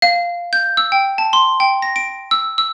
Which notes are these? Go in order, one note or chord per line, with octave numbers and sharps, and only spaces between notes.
F5
G6
E6
G5
A5
C6
G5
A#6
D7
E6
E6